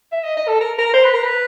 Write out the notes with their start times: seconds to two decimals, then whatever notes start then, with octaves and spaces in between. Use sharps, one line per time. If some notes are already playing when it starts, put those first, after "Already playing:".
0.12 E5
0.23 D#5
0.37 D#5
0.48 A4
0.60 A#4
0.78 A#4
0.93 C5
1.04 B4
1.14 A#4
1.24 B4